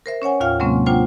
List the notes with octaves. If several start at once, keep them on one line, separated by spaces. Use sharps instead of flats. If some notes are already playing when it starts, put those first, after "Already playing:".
A#4 C5 E5
C#4 C#5 F#5 G#5
D#2 A2 F4 F5 G5 F6
C3 F#3 G#3 A#3 C4 C#4
A#3 D4 F4 C5 F#5 G5